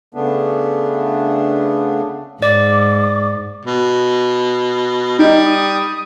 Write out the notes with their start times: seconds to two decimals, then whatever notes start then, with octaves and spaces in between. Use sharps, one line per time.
0.14 C#3 A3 B3 D4
2.42 G#2 D5 D6
3.65 B2
5.19 G3 D#4
5.45 D#6